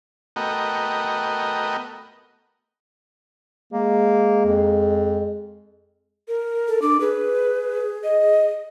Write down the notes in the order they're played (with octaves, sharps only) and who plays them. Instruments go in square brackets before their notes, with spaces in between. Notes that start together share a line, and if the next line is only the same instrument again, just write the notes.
[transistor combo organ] A3 B3 F#4 A#4 D#5 G5
[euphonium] G#3 [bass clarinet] A#3
[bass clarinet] F2
[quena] A#4
[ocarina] A4
[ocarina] D4 [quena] D6
[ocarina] G#4 [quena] B4
[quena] D#5